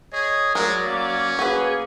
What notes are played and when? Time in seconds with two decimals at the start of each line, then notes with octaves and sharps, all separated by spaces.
0.12 G#4 C#5 D#5
0.55 F#3 G#3 G#4 A#4 D5
0.85 A#3 C#4
1.39 A#3 F#4 G#4 B4 G#5